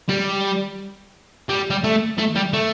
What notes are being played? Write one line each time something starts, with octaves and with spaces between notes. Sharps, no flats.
G3
G3
G3
A3
A3
G3
A3